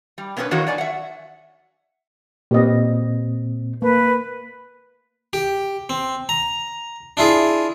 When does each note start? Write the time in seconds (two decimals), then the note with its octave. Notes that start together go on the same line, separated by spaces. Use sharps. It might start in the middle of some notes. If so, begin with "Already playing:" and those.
0.18 G3
0.37 B2 B3 C#4 F#4 B4
0.51 D#3 E3 F#3 A#3 D#4 F#4
0.67 F#3 D5 G#5
0.78 E5 F#5
2.51 A#2 C4 G4 B4 D#5
3.82 A#3 B4
5.33 G4
5.89 C4
6.29 A#5
7.17 D4 E4 F4 G#4